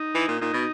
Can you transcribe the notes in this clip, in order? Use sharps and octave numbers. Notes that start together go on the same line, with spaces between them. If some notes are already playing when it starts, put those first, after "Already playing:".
Already playing: D#4
E3
A#2
A#2 D#4
B2